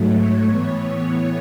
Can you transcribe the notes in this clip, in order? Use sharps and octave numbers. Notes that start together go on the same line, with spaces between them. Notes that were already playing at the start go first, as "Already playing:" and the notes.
Already playing: G#2 F#3 A3
C#5
A2 E3 B3 C#5